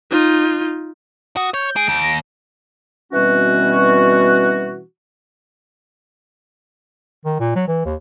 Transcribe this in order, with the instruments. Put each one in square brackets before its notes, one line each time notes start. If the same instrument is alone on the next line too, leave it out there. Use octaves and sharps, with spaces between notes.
[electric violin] D#4 F4
[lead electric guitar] F#4 [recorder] D#6
[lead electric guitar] C#5 [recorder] G6
[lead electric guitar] G#3 G#4 [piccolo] D7
[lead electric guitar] D#2
[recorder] A#6
[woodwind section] B2 E3 G3 C4 C#4 F#4
[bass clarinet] D#3
A#2
F#3
E3
D#2